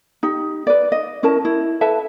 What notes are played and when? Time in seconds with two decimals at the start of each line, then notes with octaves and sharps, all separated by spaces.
0.23 D#4 G4
0.67 B4 D5
0.92 D#5
1.23 C#4 E4 A#4 A5
1.45 E4
1.81 A4 B4 E5 A5